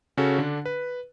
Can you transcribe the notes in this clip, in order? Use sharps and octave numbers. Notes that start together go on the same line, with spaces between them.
C#3 C#4 F#4 A4
D3 D4
B4